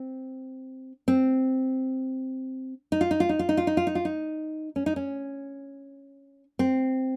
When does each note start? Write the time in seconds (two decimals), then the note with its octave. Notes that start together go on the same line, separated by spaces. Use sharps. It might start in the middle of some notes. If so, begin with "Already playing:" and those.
Already playing: C4
1.08 C4
2.92 D#4
3.01 F4
3.11 D#4
3.20 F4
3.29 D#4
3.39 F4
3.49 D#4
3.57 F4
3.67 D#4
3.77 F4
3.87 D#4
3.95 F4
4.05 D#4
4.76 C#4
4.86 D#4
4.96 C#4
6.59 C4